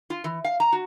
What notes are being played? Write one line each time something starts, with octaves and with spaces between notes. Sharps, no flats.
F4
E3
F5
A#5
F#4